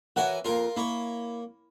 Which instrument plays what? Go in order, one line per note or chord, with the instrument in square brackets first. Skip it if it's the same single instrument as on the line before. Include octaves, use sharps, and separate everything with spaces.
[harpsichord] E3 A#4 G#5 [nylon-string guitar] F#4 C#5 F#5
[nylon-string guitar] F2 A#3 [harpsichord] F4 A#4
[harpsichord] A#3 C#5 [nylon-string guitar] E4